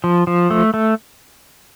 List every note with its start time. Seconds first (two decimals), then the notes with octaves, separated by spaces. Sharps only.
0.04 F3
0.27 F3
0.50 A3
0.74 A3